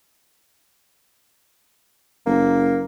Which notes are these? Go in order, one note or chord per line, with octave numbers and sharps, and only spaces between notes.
F#1 A#3